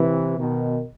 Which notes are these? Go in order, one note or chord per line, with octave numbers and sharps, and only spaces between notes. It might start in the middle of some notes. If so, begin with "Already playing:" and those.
Already playing: C3 E3
B2 D#3